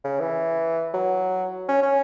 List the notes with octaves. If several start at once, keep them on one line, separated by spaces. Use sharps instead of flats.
C#3
E3
F#3
C#4
C#4